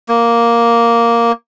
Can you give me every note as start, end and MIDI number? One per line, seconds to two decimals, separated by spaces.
0.08 1.32 58